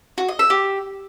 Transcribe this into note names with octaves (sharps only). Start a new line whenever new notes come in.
F#4
D#5
E5
G4